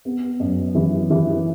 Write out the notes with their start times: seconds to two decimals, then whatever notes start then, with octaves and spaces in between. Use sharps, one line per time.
0.05 B3
0.40 F#2
0.75 E3
1.10 E3